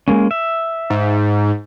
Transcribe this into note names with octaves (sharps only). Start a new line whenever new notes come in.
G#3 A#3 C#4
E5
G#2